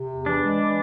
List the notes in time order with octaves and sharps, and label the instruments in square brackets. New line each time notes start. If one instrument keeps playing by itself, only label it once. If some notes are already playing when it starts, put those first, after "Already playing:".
Already playing: [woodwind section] C3
E2
[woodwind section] E3 [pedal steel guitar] D4
[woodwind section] G#3
E3